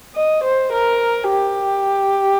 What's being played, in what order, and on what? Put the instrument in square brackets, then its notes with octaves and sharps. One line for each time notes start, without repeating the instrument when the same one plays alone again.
[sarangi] D#5
C5
A#4
G4